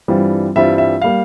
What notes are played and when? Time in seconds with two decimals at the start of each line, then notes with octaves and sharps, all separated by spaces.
0.08 G2 E3 G3 C4 F4
0.55 G2 E3 G3 C4 F4 E5
0.78 E5
1.02 G3 A#3 F5